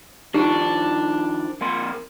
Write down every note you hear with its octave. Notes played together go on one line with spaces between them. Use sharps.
D#3 F3 D4 D#4 G4
F2 A#3 C6